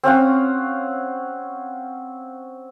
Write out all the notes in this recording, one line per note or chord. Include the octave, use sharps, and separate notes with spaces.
C4 C#4 F5 F#5